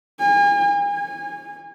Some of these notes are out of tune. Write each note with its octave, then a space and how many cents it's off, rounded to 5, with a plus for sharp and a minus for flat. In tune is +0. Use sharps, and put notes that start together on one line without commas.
G#5 -40
G#5 -25